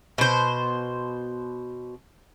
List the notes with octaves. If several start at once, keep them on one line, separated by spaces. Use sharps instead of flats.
B2 C5